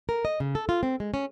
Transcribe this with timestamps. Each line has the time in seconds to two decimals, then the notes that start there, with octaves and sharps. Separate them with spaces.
0.09 A#4
0.25 D#5
0.40 C#3
0.55 A4
0.69 F4
0.83 C4
1.00 G#3
1.14 C#4